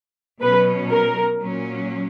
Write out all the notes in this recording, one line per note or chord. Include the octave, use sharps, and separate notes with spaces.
B2 F#3 C#4 B4
A#4
A#2 F#3 C#4